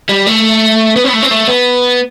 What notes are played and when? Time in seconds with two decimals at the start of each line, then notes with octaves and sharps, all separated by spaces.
0.09 G3
0.26 A3
0.96 B3
1.04 C4
1.08 B3
1.13 A3
1.22 C4
1.31 A3
1.48 B3